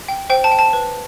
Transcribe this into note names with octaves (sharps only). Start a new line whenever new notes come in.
G5
C5 G5
A5
G5
A5
B4